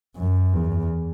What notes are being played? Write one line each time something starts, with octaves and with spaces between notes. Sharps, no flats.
F#2
E2